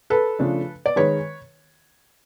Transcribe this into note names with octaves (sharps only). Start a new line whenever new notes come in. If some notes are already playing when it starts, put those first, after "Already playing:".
A4 B4
C#3 F3 A3 D4
D5
D#3 G#3 B4 C#5